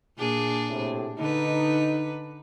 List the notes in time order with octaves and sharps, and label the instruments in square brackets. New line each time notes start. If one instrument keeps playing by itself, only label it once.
[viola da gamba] A#2 D4 G#4
[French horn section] A2 C3
[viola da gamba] D3 B4 [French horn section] D#4